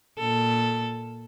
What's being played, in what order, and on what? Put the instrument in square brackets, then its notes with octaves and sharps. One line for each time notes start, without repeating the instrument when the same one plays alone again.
[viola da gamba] A#2 A4